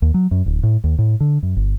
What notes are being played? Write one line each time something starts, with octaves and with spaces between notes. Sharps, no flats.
D#2
F#3
F#2
D1
A2
D#2
A2
D3
F#2
G1